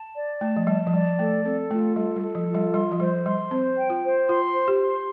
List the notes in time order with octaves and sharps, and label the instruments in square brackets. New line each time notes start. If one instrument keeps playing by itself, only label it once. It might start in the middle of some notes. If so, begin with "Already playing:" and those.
Already playing: [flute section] A5
D5
[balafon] A3 [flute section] A5
[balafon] F3
[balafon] G3 [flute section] A5
[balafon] F3
[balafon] G3 [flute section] D5
[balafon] A3 [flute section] A4
[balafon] C4 [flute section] A4
[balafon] A3 [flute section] F4
[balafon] G3 [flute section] A4
[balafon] G3
[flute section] A4
[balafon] F3
[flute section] F4
[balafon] G3
[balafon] G3 [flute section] C6
[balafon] F3
[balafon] G3 [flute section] C5
[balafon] G3 [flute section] C6
[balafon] C4 [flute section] C5
[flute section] G5
[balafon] F4
[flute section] C5
[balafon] F4 [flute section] C6
[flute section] C5
[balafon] G4
[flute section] C6